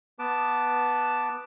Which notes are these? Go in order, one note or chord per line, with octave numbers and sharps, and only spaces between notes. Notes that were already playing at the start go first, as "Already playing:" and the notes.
B3 B4 A5 D6